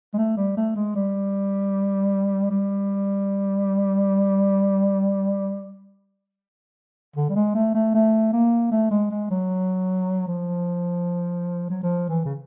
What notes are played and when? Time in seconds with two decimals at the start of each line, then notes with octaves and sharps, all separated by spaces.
0.13 G#3
0.18 A3
0.37 G3
0.57 A3
0.76 G#3
0.95 G3
2.51 G3
7.16 D3
7.29 G3
7.36 G#3
7.55 A3
7.74 A3
7.95 A3
8.33 A#3
8.72 A3
8.91 G#3
9.11 G#3
9.30 F#3
10.27 F3
11.70 F#3
11.83 F3
12.09 E3
12.25 C#3